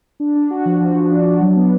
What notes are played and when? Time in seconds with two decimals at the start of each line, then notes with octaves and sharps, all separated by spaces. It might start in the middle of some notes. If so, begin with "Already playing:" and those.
0.20 D4
0.35 D4
0.51 F#4
0.65 F3
0.81 F3
0.95 F3
1.11 D4
1.26 D4
1.41 F#3
1.56 B3